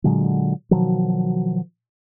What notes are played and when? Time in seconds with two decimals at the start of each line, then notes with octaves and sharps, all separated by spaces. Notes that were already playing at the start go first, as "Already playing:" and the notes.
0.04 A#2 D3 F#3 G#3
0.71 B2 D#3 F3 F#3